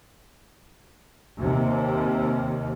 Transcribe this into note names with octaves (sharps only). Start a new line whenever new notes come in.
D#2 C3